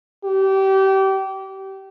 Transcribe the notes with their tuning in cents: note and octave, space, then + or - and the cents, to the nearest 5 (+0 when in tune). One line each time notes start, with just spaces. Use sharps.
G4 -25